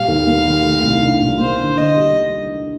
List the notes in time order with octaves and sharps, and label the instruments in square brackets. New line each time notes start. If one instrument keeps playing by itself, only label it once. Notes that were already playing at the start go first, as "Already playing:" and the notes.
Already playing: [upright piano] A#2 G3 [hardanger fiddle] F5
[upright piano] D#2
A#3
D#3
A3
C2
D4
A#2
[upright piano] A#3 [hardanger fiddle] C5
[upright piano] D3
[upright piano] D3 [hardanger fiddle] D#5
[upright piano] G3